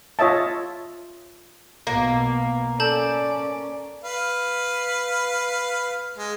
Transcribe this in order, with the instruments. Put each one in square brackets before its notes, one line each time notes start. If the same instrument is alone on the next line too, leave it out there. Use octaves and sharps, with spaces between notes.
[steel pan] F4 C#5 D#5 E5 A5
[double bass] B1 B2 [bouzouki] A#3
[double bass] C#4 [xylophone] A4 A5 G6 [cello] D5
[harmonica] B4 F5
G#3